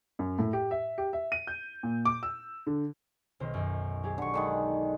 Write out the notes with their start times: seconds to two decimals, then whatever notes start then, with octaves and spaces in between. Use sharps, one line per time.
0.19 F#2
0.39 A2
0.53 G4
0.71 E5
0.98 G4
1.13 E5
1.32 D#7
1.47 G6
1.83 A#2
2.05 D6
2.23 E6
2.67 D3
3.40 B1 D#3 C5
3.54 F#2 D#3
4.03 F#3 G4 G#4
4.18 D3 C#6
4.34 D3 D#3 G#3